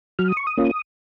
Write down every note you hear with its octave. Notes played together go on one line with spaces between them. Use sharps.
F#3 F6
D#6
C#6
D#6
A#3 C#4 F4